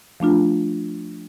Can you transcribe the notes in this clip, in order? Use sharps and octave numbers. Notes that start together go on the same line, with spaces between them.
F3 A3 D4 F4